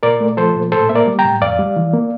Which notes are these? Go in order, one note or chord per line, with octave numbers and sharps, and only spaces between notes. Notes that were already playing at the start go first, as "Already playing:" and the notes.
A#2 A#4 D5
A3
F3 A4 C5
A#2
A2 A4 C5
A#3 E5
A#4 D5
G3
G5 A#5
A2
F2 D5 F5
G3
E3
A#3